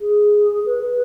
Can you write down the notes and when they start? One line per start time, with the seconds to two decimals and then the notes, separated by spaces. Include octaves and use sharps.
0.01 G#4
0.66 B4